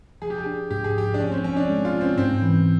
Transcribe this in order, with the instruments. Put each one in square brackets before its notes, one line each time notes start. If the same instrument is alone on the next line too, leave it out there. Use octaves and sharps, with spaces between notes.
[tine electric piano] F3 [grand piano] G#4
[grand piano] G4
G#4
[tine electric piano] D4
[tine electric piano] G#2 [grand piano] G4
[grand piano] G#4
[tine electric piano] F3 [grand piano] G4
[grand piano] D4
[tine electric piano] F3 [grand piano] C#4
[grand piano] C4
[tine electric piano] F3 [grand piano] C#4
[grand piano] D4
[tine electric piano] G#3
[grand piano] F4
[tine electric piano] C#4
[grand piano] C4
[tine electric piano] G#2 [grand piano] C4
[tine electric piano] E3